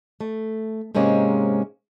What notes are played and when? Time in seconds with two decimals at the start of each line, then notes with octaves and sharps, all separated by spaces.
0.21 A3
0.95 G#2 C3 G#3 A#3 C#4